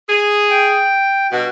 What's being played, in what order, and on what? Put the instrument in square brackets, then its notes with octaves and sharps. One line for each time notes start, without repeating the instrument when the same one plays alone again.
[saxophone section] G#4
[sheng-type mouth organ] G5
[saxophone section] G2 B2 [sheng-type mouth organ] F#4